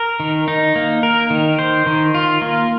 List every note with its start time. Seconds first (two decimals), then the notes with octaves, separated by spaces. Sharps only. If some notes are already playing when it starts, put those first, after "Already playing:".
Already playing: A#4
0.20 D#3
0.48 D#4
0.76 A#3
1.03 A#4
1.30 D#3
1.59 C5
1.86 D#3
2.15 F4
2.42 A#3